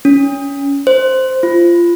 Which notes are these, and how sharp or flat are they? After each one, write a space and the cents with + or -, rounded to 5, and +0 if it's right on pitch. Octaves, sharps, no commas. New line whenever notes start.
C#4 +25
C5 +0
F4 -20